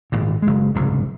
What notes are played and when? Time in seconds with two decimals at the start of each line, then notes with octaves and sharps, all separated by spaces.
0.12 G#1 A#2
0.42 F#1 G#3
0.75 F#1 C2 G#2